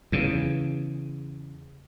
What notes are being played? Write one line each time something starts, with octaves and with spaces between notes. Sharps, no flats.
E2 C#3